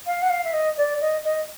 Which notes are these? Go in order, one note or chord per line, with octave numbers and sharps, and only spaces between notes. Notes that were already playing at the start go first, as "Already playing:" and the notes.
F5
F#5
F5
E5
D#5
D5
D#5
D#5